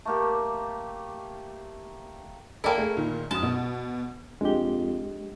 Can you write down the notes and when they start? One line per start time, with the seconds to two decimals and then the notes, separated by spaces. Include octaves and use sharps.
0.05 A3 A#3 G4
2.64 A#3 E4 A4 D5 G5
2.78 A3 G#4
2.97 A#2 D#3
3.31 F#2 A5 D#6
3.43 B2
4.41 F2 G#3 D4 G4 D#5 G7